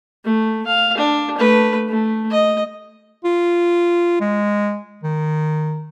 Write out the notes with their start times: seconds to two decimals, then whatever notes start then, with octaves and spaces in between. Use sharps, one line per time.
0.24 A3
0.66 F5
0.97 D4
1.37 A3 B4
1.88 A3
2.31 D#5
3.25 F4
4.21 G#3
5.03 D#3